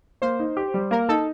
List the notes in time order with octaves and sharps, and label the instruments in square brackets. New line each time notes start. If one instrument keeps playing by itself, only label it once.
[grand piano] A#3 [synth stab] C5
[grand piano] D#4
G4
G3
[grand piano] A#3 [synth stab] A#4
[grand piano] D#4 [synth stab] A4